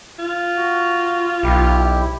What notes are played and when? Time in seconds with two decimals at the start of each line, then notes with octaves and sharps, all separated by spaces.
0.19 F4
0.56 F#4
1.43 B1 E4 G4